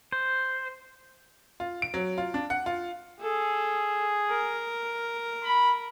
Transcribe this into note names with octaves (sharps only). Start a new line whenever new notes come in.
C5
F4
D7
F#3
F4
D4
F#5
F4
G#4 A4
A#4
B5